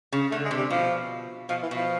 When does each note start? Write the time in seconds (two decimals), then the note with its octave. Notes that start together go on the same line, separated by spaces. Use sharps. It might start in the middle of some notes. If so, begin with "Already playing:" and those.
0.12 C#3
0.31 D3 A3
0.45 G#3
0.51 C3
0.58 G3
0.70 B2 F3
1.49 B2 F3
1.62 E3
1.71 B2 F3